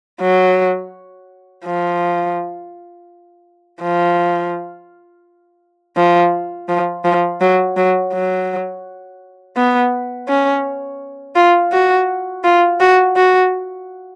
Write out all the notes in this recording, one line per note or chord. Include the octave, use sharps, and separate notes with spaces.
F#3
F3
F3
F3
F3
F3
F#3
F#3
F#3
B3
C#4
F4
F#4
F4
F#4
F#4